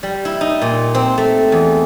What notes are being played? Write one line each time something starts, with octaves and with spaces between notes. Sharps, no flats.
G3
E4
D#4
A#2
C4
A3
E2